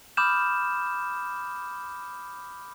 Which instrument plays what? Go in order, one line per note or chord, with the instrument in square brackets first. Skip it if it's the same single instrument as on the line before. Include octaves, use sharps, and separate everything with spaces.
[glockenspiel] B5 D6 D#6 F6 G6 E7